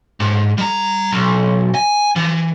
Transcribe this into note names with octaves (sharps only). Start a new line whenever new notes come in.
G#2
G3 A#5
B1
G#5
E3